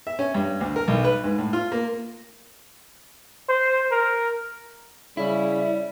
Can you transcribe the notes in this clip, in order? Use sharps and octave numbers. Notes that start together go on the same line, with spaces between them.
E5
C#4
G2
D2
A#4
B1
B4
G#2
A2
F4
A#3
C5
A#4
C#3 G3 E4